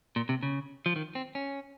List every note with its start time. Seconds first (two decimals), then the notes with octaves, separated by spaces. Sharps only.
0.16 A#2
0.29 C3
0.43 C#3
0.86 F3
0.96 D#3
1.15 C4
1.35 C#4